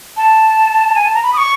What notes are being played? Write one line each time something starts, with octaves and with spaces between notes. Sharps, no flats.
A5
G#5
A5
A#5
B5
D#6
C#6